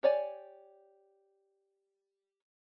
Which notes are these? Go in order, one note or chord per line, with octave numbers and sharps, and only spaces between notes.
G4 C#5 D5 G#5